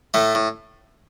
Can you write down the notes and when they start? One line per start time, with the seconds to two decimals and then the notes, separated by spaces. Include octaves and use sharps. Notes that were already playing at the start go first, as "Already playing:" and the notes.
0.14 A2 A3
0.35 A2